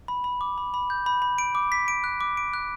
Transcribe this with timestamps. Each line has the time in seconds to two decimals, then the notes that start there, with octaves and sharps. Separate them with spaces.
0.08 B5
0.24 B5
0.41 D6
0.58 B5
0.74 B5
0.90 G6
1.06 B5
1.22 B5
1.38 D7
1.55 D6
1.72 B6
1.88 D7
2.04 F#6
2.21 D6
2.37 D7
2.54 F#6